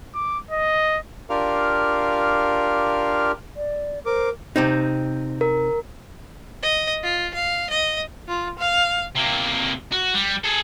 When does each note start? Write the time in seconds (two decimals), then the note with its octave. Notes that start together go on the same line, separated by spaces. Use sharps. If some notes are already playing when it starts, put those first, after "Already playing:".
0.15 D6
0.51 D#5
1.30 D4 F4 G4 A#4 F5
3.56 D5
4.06 A#4 C5 D6
4.56 C3 C4 D#4
5.41 A#4
6.63 D#5
7.03 F4
7.34 F5
7.70 D#5
8.28 F4
8.59 F5
9.15 C3 A#3
9.92 F#4
10.14 G3
10.44 G#4 A4